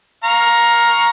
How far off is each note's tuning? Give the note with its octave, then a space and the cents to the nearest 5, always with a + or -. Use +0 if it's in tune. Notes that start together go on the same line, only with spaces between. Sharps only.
F5 +15 A#5 +10 C#6 +0